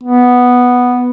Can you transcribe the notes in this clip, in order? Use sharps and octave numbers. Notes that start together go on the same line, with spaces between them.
B3